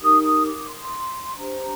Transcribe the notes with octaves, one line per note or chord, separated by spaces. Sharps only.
D#4 G4 A#4 D#6
D#6
D6
C6
D4 G4 C5 A#5